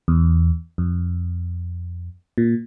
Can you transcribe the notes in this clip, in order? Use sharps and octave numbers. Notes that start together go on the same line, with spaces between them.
E2
F2
A#2